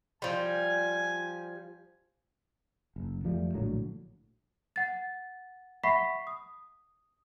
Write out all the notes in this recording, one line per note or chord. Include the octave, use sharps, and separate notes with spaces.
F3 G3 G#5
F#1
F2 F3 G3 A3
A#1 A2 D3 F#3
F#5 A6
E5 F#5 B5 C#6 B6 C7
D#6